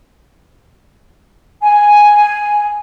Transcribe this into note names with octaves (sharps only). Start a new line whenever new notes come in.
G#5